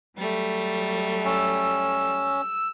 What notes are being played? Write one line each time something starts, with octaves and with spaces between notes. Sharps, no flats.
F#3 G3 A3
C#4 E6